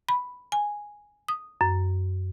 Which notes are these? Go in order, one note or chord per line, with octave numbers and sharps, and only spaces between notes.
B5
G#5
D#6
F#2